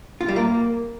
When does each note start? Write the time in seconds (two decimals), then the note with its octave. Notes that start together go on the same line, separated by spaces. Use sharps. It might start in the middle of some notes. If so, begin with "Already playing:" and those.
0.21 F4
0.28 G3
0.36 A#3